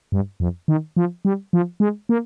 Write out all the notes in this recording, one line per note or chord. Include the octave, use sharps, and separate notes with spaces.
G2
F2
D#3
F3
G3
F3
G#3
A#3